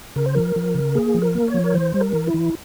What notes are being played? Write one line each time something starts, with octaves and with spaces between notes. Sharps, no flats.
C#3 A#4
C5
F3 A#4
F3
C#3
A#3 G#4
F3
A#4
A#3
C#5
F3
A#4
E3 C5
G3
A#4
E3
E4
E3